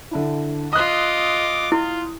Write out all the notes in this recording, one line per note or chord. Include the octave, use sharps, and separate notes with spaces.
D3 D4 E4
F4 D#5 D6 D#6 F#6
E4 F4